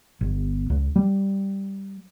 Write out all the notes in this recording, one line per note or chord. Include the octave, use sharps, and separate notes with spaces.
G1
C#2
G3